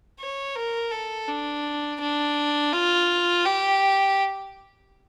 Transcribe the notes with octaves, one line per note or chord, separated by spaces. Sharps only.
C#5
A#4
A4
D4
D4
F4
G4